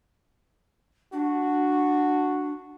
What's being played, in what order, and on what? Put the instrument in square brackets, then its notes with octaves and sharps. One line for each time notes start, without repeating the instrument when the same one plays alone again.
[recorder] D4 [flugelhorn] F#4